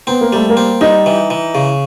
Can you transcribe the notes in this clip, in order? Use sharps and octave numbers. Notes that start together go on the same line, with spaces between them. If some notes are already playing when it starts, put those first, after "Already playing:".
B3 C4
A#3
G3 A3
A#3
C4
G3 D#4
E3
E3
C#3